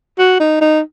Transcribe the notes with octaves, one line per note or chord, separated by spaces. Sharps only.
F#4
D#4
D#4